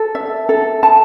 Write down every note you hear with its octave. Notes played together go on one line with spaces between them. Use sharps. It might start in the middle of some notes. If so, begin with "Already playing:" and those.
Already playing: A4
E5
A4
A5